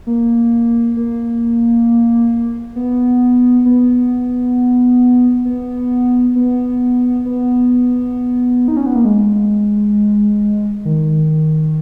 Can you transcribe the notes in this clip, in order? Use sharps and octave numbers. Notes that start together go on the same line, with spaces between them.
A#3
A#3
B3
B3
B3
B3
B3
D#4
C#4
B3
A#3
G#3
D#3